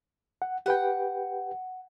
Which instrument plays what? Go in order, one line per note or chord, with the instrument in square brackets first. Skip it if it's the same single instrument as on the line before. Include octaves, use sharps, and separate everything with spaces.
[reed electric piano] F#5
[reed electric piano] G4 B4 G5 [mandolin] F#5